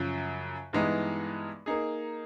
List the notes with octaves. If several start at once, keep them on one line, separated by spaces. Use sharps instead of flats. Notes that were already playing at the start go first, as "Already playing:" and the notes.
Already playing: F#2 C#3 F3
G2 E3 G#3 B3 D#4
A#3 D#4 G#4